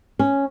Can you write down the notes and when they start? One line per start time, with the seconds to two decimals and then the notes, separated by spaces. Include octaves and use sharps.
0.19 C#4